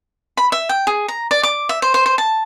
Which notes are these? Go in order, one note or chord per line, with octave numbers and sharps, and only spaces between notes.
B5
E5
G5
G#4
A#5
D5
D6
E5
C5
C5
C5
A5